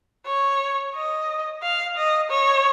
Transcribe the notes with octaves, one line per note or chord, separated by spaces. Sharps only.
C#5
D#5
F5
D#5
C#5